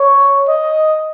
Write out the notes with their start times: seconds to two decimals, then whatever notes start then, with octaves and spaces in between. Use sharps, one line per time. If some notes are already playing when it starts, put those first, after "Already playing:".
Already playing: C#5
0.48 D#5